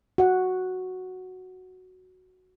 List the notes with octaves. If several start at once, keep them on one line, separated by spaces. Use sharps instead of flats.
F#4 F#5